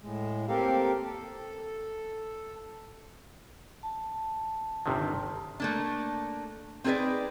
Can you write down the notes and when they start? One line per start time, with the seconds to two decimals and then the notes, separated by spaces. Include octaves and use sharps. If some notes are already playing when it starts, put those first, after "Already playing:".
0.02 A2 G#3
0.48 A#3 C4 G4 A4 A#4 F5
1.04 A4
3.83 A5
4.86 G1 C3 D#3
5.60 A3 A#3 D4
6.84 C4 D#4 G#4 A#4 B4 D5